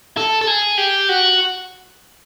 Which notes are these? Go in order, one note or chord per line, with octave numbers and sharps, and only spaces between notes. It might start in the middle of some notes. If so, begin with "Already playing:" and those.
A4
A4
G#4
G4
F#4